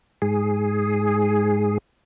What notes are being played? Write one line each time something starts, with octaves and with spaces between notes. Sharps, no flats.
G#2 G#4